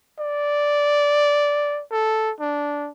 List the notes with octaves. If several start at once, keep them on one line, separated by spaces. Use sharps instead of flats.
D5
A4
D4